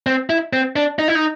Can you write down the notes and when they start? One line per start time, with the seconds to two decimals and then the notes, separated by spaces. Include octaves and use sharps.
0.07 C4
0.30 E4
0.53 C4
0.76 D4
0.99 D#4
1.08 E4
1.15 D#4